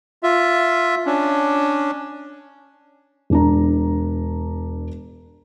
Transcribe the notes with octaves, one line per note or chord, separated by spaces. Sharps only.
F4 E5
C#4 D4
E1 D4 A#5